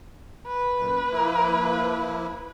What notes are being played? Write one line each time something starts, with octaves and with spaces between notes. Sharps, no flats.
B4
F#2 A#2
F3 A#3 E4